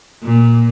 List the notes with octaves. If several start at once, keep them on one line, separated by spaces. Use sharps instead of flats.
A#2